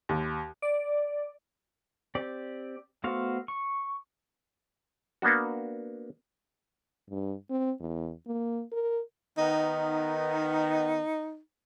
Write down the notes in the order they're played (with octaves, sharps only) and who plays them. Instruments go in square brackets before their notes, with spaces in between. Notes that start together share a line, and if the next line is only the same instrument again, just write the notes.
[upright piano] D#2
[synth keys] D5
[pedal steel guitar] C4 G4 D5
A3 B3 F#4 C5 F5
C#6
[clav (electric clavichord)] A#3 B3 D4 F#4
[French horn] G2
C4
E2
A#3
A#4
[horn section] D#3 B3 [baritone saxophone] D#4